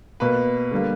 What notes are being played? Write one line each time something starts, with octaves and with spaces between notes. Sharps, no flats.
B2 A#3 B4
D3 G3 A#3